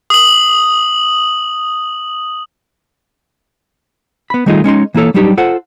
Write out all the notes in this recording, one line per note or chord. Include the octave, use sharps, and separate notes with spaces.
D#6 F#7
B3 B5
D#3 G3 A3 D#4 F4 G#4
G#3 C#4 D#4 C6
E3 A#3 E4 A4 C#5
F#3 G3 D4 D#4 G4
F4 A4 C5 F#5